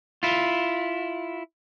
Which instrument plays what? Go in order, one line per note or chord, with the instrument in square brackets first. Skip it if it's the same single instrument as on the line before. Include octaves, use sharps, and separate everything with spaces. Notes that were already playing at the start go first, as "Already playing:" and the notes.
[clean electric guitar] E4 F4